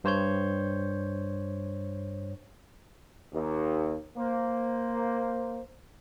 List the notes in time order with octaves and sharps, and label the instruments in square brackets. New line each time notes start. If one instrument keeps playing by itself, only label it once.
[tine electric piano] G2 C5 C#5 G6
[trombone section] D#2
A#3 C5